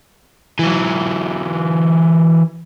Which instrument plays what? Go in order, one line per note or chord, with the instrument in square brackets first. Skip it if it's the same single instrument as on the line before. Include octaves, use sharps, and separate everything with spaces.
[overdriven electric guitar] E3 F#3